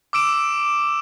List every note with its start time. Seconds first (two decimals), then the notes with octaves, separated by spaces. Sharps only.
0.13 D6 E6 D7 E7